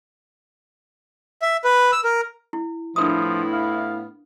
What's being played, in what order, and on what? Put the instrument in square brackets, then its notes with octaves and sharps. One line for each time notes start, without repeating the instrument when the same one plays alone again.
[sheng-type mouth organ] E5
B4
E6
A#4
[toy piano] E4
[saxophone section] A2 B3 E4 [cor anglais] F3 [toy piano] D4 A#4 D#6
[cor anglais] F5